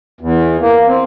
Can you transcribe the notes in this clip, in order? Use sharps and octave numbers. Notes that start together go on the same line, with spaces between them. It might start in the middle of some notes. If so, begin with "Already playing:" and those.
E2
A#3
C4